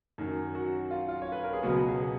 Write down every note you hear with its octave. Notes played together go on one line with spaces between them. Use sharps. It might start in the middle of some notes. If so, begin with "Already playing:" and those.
F#2 D#3 F#3
F#4
F4
F4
C#5
B4
A#4
G#4
C#2 B2 F#3 B3 F#4
G#4